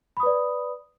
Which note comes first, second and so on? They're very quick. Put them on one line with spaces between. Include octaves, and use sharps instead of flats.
B5 D#6 B4 D5